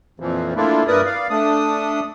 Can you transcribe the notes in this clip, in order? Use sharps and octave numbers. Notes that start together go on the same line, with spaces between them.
F2 A#2 E3 F3
A3 A#3 D4 E4 F4
G2 E4 A#4 B4 D5 D#6
D5 F5
A3 D4 D#6